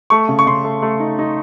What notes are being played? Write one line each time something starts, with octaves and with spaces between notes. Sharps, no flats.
A3 C#6
C#3
C#6
C#3 C6
A3
A3
D#4
D#4